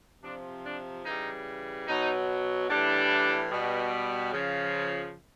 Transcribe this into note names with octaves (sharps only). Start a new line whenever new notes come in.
C3 F3 D4
D4
C#3 E3 G3 D#4
B2 F#3 D#4
A2 E3 G3 D4
B2 G3
C#3 F3